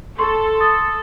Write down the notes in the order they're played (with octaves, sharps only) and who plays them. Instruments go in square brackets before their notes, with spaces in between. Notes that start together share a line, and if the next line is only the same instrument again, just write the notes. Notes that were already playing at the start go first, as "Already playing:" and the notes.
[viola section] A4 [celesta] C6 C#6
[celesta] D#6 A6